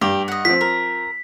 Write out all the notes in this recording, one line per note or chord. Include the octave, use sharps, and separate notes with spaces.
G2 G4
D#5 F#5
F3 C4 B6
A#4